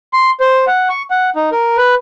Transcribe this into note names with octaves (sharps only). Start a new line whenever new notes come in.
C6
C5
F#5
C#6
F#5
D#4
A#4
B4